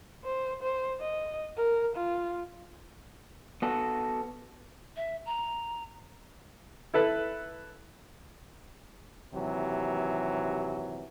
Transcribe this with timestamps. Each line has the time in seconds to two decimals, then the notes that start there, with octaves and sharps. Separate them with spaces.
0.24 C5
0.63 C5
1.01 D#5
1.57 A#4
1.96 F4
3.62 B3 F#4 A4
4.97 E5
5.26 A#5
6.94 E4 A4 B4
9.34 D#2 C3 E3 F#3